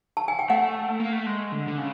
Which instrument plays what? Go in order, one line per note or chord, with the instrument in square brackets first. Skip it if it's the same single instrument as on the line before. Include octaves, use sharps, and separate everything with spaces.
[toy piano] A5
G#5
G5
[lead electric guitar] A3 [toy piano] F#5
[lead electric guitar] A#3
A3
G#3
D3
D3
C#3